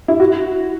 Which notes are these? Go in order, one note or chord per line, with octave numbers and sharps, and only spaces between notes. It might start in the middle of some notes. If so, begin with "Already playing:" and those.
E4
F#4